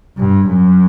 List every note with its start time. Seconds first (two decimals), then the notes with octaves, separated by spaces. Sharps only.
0.17 G2
0.47 F#2